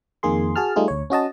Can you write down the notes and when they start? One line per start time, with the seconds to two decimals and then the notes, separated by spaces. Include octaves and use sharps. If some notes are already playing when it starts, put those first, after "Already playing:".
0.23 F2 D#3 A#3 G#4 C6
0.56 F#4 G#4 A5 F6
0.76 G3 A3 D#4 F4 G#4
0.88 D2 C#5
1.10 C#4 F#4 D#5 A5